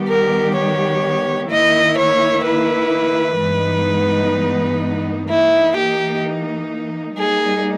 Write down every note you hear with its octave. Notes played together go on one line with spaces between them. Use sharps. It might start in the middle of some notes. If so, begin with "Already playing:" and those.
Already playing: D#3 G3 B3 G4
A#4
C#5
D#3 A#3 E4 D#5
C#5
B4
G2 E3 G#3 B3 D#4
E3 A#3 D#4 E4
G4
G3 A#3 D#4 G#4